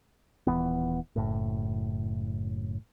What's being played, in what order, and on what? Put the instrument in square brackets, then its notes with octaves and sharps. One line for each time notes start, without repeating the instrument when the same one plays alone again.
[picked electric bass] D#1 D#2 E3 B3
F#1 A2